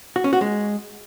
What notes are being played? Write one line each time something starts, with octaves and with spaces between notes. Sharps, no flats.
F#4
C#4
F#4
G#3